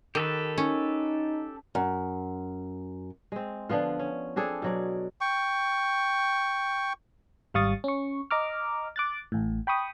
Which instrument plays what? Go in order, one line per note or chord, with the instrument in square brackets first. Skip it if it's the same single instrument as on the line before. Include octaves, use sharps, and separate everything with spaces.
[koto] D#3 [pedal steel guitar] G4 A4 B4
[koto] C#4 [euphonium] D#4
[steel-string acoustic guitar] F#2
[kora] G#3 C4
D3 F3 B3 F4
C#4
C4 D4 G#4 A4
B2 F#3 D5
[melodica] G5 C#6
[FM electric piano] G#1 G3 F5 C#6 D#6 A6
C#4 C#6
D#5 A#5 D6 F6
D6 F#6 A6
A1 A2
G5 B5 C#6 D#6